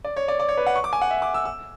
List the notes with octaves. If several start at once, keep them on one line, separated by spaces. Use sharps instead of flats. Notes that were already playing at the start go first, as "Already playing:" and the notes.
D5
C#5
D5
D5
C#5
B4
F#5
C#6
D6
G#5
F#5
E5
D6
E6
E6